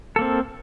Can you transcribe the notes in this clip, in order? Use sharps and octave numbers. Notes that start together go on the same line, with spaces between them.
A#3 C4 A4